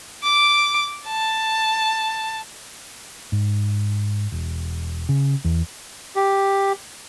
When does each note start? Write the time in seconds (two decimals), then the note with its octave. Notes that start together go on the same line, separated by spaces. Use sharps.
0.23 D6
1.06 A5
3.32 G#2
4.32 E1
5.09 C#3
5.45 E2
6.16 G4